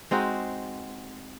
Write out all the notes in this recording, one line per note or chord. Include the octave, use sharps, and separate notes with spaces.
G#3 C4 D#4 F#4